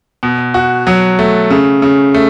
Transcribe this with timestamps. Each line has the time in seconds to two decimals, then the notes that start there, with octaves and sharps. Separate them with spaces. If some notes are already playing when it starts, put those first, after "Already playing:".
0.23 B2
0.54 F#4
0.87 F#3
1.19 A3
1.50 C#3
1.82 C#3
2.14 A3